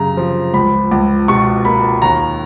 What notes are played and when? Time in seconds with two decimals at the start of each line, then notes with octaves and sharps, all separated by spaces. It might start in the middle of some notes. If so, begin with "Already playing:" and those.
Already playing: F#2 C#3 A#5
0.17 F3
0.54 C#2 B5
0.91 C#2
1.28 B2 C#6
1.65 A#3 B5
2.02 D#2 A#5